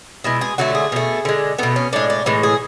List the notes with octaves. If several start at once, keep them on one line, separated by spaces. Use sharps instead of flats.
B2 G#3 E4
G#4
D3 F#3 A3 F#4
G#4
B2 A3
D3 G#3
B2 A3 B3
C#4
A2 G#3 D4
D4
A2 E3 G#3
G#4